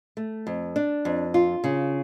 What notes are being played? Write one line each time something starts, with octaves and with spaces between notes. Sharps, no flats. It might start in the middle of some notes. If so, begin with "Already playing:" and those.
A3
F2
D4
F2
F4
C#3